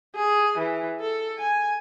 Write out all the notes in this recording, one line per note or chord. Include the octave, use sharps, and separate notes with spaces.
G#4
E3
A4
G#5